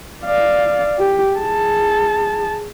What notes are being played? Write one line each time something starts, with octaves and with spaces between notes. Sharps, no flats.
D5 F5
G4
G#4 A5